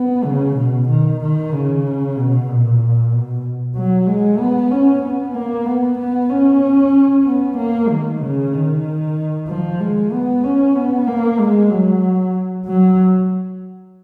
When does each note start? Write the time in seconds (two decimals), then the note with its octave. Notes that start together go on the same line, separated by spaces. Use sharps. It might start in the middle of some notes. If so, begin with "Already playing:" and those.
Already playing: B3
0.25 C#3
0.57 B2
0.89 D#3
1.21 D#3
1.53 C#3
2.16 B2
2.48 A#2
3.12 B2
3.76 F#3
4.07 G#3
4.39 B3
4.71 C#4
5.03 B3
5.34 A#3
5.66 B3
5.99 B3
6.30 C#4
7.25 B3
7.58 A#3
7.89 D#3
8.21 C#3
8.53 D#3
9.48 F3
9.80 G#3
10.12 B3
10.44 C#4
10.76 B3
11.08 A#3
11.40 G#3
11.70 F#3
12.66 F#3